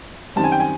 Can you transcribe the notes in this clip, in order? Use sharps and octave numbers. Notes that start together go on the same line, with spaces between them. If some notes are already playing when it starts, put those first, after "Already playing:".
F#2 D#3 G3 C4 A5
G#5
G5
G#5